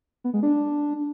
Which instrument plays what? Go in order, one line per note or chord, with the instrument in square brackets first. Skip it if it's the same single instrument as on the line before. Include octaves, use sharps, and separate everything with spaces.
[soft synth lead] B3
G#3
D4